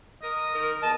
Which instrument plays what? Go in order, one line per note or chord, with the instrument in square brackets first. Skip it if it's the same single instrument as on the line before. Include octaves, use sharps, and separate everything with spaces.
[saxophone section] A#4 [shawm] D#5
[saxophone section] D#3 A#4
[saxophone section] E2 D#5 [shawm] A5